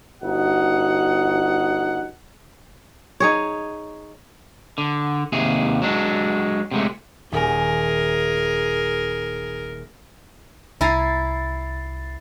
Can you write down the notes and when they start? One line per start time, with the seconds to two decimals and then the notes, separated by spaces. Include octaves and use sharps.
0.22 G1 D#4 F#4 F#5
3.20 D#4 G#4 C#5
4.78 D3
5.32 D#2 C3 G#4
5.82 F#3 G#3 D4
6.71 C3 G#3 A3
7.32 D#1 G#4 A#4 G#5
10.81 C2 E4 G#5 A#5 A6 C7